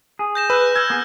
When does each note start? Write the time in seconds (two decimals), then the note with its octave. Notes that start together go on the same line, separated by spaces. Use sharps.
0.19 G#4
0.35 G6 A#6 E7
0.50 B4 E6 F#6
0.76 E6 F6 G#6 E7
0.90 B3 G#4